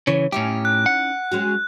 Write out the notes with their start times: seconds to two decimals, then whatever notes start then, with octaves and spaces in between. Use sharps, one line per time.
0.07 C#3 E3 C#5
0.32 A2 C#4 D#4 E4 G4
0.65 F#6
0.86 F#5
1.31 G#3 C#4 F#4